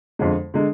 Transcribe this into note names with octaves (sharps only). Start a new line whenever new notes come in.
F2 D3 G#3
D3 G#3